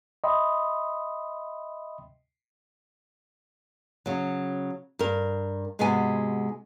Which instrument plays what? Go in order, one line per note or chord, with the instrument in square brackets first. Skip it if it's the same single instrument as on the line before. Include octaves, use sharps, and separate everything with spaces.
[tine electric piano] D#5 E5 G5 B5 C6 D#6
[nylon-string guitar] C#3 F#3
G2 A#4
G#2 C3 G#3 B3 F#4 G#5